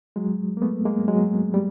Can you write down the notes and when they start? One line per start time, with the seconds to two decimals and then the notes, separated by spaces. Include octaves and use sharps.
0.16 F#3 G#3
0.57 A#3
0.62 A3 B3
0.85 G#3 A#3
1.08 F#3 G#3
1.54 G3